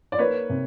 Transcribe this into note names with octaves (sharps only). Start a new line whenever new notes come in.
D5
A#3 B4 C#5
C3